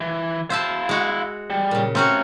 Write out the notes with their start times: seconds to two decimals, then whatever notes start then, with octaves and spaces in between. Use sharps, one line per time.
0.01 E3
0.50 E4 C5 E5 F5 A5
0.89 G#3 F#4
1.50 G3
1.71 A#2 C#3
1.95 A3 C4 C#4 F#4 A#5